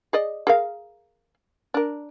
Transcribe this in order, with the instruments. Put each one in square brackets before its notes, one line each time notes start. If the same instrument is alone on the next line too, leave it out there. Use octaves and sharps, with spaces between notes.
[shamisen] G#4 D5 D#5
G#4 A#4 F5
D4 A#4